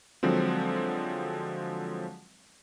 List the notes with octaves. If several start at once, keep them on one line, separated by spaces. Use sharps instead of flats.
D3 F3 F#3 G#3 C4